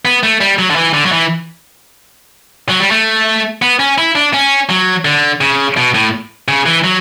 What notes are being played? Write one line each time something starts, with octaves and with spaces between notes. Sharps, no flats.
B3
A3
G3
F#3
D3
E3
D3
F#3
E3
F#3
G3
A3
B3
C#4
E4
D4
C#4
F#3
D3
C#3
B2
A2
C#3
E3
F#3